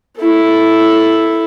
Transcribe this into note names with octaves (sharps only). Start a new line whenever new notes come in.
E4 A4